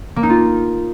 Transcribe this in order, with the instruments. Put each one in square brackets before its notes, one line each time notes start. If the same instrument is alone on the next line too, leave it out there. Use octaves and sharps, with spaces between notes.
[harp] A#3
D#4
F4